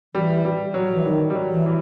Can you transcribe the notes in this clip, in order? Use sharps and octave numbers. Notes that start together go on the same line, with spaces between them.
E3 G3
G3
F#3
F#3
E3
D#3 F#3
G3
F#3
E3
E3